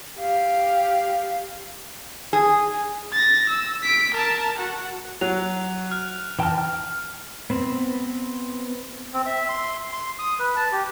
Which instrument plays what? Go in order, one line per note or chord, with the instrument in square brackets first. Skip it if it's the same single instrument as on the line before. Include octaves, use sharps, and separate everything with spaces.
[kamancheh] G4 F5
[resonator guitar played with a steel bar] G#4
[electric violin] A6 A#6
E6
B6 D7
A#4 A5
F#4 F#5
[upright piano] F#3 [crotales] F#6 F7
[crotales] F6
[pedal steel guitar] E3 G5 A5 A#5 F6
F6
B3 C4
[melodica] C4
E5
C6
C6
D#6
B4
A5
G4